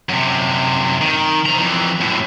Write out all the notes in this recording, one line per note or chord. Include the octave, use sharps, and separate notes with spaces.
F#2 C3
D#3
C3 A#5
F2 E3
F#2 A2